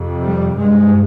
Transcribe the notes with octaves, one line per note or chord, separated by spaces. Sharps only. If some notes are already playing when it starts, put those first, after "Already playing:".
Already playing: F2 C3
G3
G2 G#3